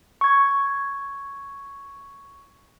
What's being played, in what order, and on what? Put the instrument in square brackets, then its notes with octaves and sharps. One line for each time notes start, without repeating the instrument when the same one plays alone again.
[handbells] C#6 G#6